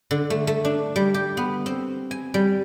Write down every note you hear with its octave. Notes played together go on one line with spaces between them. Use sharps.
D3
A3
A3
D4
G3
G4
B3
C4
G#5
G3